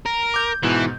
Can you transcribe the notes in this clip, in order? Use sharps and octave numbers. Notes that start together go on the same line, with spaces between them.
A#4
D6 G6
G#2 B2 E3